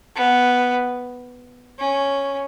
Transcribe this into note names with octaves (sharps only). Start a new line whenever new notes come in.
B3
C#4